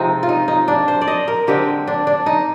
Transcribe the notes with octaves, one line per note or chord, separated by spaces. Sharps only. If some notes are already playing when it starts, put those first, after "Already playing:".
Already playing: C3 F3 G#3 C4 D#4
F4
D#4
D#4
D4
C5
D5
D#5
A#4
D3 G#3 C4 G4
D4
D4
D#4